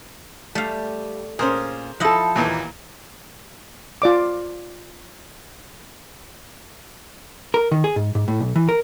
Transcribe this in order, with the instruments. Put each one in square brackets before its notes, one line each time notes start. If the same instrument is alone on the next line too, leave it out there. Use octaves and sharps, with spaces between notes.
[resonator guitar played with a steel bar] G3 [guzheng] A3 F5
[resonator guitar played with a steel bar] A#2 C#4 [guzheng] G#4 [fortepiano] A#4 C5
[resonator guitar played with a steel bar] F3 A4 [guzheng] E4 D#5 F#5
[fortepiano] D#2 A#2 E3
[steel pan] F4 D5 D6
[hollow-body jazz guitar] A#4
D#3
G#4
G#2
G#2
A2
B1
E3
A#4